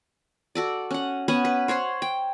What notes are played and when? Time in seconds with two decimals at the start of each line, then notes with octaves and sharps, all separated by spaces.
0.55 F#4 A4 D5
0.91 C#4 F#5
1.28 B3 C#4 F#5 G#5
1.45 B4
1.68 C5 C#5 F#5 C6
2.02 G5